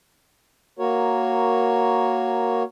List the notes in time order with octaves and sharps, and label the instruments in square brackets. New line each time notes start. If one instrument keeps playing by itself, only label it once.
[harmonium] A#3 F#4 A#4 C#5